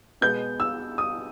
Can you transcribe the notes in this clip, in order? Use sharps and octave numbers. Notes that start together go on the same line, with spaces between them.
B2 G#3 B3 G6
E6
D#6